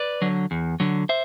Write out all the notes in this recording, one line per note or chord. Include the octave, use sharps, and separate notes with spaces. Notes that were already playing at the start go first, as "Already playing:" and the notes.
Already playing: B4 D5
D3 F#3
E2
D3 F#3
C5 E5